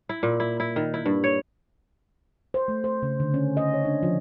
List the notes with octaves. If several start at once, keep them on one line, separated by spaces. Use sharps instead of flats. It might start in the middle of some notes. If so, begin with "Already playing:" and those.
E4
A#2
E4
E4
D#3
E4
G2
C#5
C5
A3
C5
C#3
D3
C#4
D#5
C#5
D4
F3